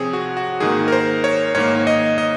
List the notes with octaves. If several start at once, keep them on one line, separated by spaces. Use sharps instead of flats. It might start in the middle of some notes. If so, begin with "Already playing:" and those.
Already playing: C3 F3 C4 G#4 C#5
F#4
F#4
G#2 D#3 A#3 G#4
A#4
C5
C#5
G#2 D#3 A#3 C#5
D#5
D#5